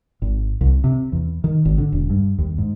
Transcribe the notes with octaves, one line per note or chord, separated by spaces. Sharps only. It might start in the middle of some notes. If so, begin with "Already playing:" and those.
G#1
C2
C3
E2
D#3
G#1
D3
E1
G2
D#2
G#2